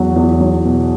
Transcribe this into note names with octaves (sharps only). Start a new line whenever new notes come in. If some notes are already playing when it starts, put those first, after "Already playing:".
Already playing: E2 F#3
E2
F#3
B2